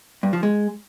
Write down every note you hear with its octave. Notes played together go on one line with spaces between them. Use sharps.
G2
F3
G#3